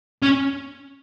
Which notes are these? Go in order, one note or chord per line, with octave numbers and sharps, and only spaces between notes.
C#4